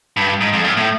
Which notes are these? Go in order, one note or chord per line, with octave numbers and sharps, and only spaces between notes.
G2
G#2
F2
F#2
A2